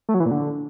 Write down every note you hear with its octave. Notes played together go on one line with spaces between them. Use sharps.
A3
F#3
E3
A#2
D3